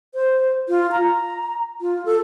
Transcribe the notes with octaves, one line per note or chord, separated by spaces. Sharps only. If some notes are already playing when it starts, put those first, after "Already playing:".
C5
F4
A#5
F4
A4